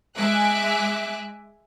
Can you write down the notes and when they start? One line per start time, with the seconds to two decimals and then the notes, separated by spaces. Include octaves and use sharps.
0.16 G#3 E5 G#5 D6 F#6